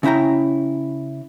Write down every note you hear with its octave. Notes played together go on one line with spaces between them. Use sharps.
C#3 C#4 E4 G5 A#5